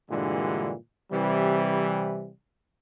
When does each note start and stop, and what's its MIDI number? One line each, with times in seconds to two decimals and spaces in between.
0.11 0.74 43
0.11 0.74 46
0.11 0.74 50
0.11 0.74 52
0.11 0.74 55
0.11 0.74 56
1.12 2.30 48
1.12 2.30 52
1.12 2.30 55